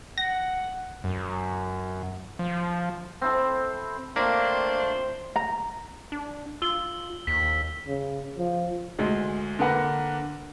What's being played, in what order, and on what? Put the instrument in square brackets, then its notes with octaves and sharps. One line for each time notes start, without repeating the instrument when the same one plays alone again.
[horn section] F#5 [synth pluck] A#6
[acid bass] F#2
F3
[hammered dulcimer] C4 E4 A4
[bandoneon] A3 C4 F4 [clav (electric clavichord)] A#3 [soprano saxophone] D4 [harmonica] C5
[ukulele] A#5
[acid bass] D4
[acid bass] F4 [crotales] E6 G7
[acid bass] D#2 [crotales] B6
[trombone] C#3
F3
[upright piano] D2 G#3
D3 A#3 A#4 B4 F#5